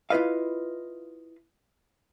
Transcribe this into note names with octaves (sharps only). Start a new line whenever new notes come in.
E4 F4 G#4 B4 D#5 F5